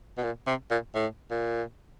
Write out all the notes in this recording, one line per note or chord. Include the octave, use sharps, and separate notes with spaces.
B2
A#2
C3
A#2
A2
A#2